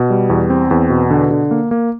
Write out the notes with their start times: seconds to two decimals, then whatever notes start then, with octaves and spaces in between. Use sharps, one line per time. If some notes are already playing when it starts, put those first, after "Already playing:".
Already playing: B2
0.10 G3
0.30 E2
0.50 C4
0.71 E2
0.90 B2
1.11 D3
1.31 D3
1.51 A#3
1.71 A#3